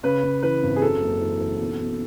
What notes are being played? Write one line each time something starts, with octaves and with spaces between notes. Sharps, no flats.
C#3 B4
C#3
E3 B4
G#1
G#4
F#2 A4
F#1
E3
E3
B1
B1